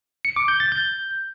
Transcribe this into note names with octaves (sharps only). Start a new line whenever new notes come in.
C#7
D6
G6
A6
G6